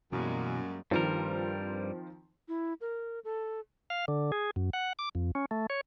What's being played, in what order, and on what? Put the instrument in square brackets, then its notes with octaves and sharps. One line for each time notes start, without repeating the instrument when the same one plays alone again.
[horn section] F#2 [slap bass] B2 E3 [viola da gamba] G3 G#3 A#3
[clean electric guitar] G2 G3 A#4 [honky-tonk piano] D#3 F3 C4
[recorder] E4
A#4
A4
[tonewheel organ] F5
D3
G#4
F#2
F#5
D6
F2
C#4
A3
C#5